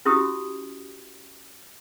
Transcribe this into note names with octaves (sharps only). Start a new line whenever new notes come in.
C#4 E4 F#4 G4 D#6